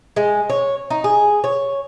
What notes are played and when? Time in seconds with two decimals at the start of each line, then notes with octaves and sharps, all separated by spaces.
0.16 G#3
0.50 C#5
0.90 D#4
1.04 G#4
1.44 C#5